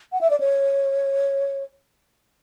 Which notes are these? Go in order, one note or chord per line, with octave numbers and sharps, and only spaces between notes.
F#5
E5
D5
C#5